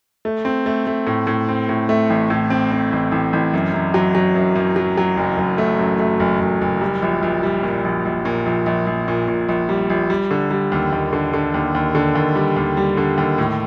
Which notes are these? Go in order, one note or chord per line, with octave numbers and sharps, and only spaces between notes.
A3
C4
A3
A3
A2
A2
C4
A2
A3
A1
A2
C4
C4
A1
A1
A1
F#2
F#2
F#3
F#3
F#2
F#2
F#3
F#3
F#1
F#1
A3
F#2
A3
F#1
F#1
F#1
G3
A#1
A#1
G3
A#2
A#1
A#1
A#2
A#1
A#1
A#1
A#2
A#2
A#1
G3
A#1
G3
D3
G3
D#2
D#2
D3
D3
D#2
D#2
D3
D#2
G3
D#2
G3
D3
D#2
A2